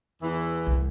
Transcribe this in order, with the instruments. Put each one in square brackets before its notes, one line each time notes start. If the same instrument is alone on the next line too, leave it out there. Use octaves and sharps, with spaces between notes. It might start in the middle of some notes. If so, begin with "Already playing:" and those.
[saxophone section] E2 E3
[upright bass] C2